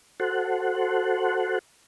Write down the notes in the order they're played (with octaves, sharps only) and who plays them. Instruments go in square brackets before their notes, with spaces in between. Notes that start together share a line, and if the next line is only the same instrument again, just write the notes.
[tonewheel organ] F#4 A4 C5 F#5